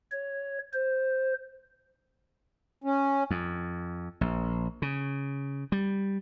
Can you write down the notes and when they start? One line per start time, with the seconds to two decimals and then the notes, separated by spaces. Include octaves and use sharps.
0.12 C#5
0.73 C5
2.84 C#4
3.31 F2
4.21 A#1
4.82 C#3
5.72 G3